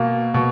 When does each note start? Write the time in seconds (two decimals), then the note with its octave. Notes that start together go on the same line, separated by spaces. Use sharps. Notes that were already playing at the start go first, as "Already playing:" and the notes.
Already playing: B2 A#3
0.34 B2